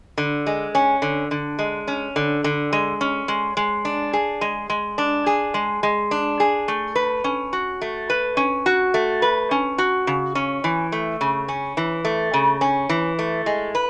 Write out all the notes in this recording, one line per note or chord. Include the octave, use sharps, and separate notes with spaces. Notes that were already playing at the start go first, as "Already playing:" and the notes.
D3
G#3
C#4
D3
D3
G#3
C#4
D3
D3
G#3
C#4
G#3
G#3
D4
G#4
G#3
G#3
D4
G#4
G#3
G#3
D4
G#4
A3
B4
C#4
F#4
A3
B4
C#4
F#4
A3
B4
C#4
F#4
C#3
C#4
E3
A3
C#3
C#4
E3
A3
C#3
C#4
E3
A3
G#3
B4